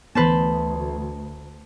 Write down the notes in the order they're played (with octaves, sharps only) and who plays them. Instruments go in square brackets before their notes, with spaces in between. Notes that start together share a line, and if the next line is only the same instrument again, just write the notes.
[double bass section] D2 [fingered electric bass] E3 B3 [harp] B4 C5 A5